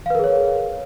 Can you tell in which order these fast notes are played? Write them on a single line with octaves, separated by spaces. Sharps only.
F5 B4 A#4 G#4 C#5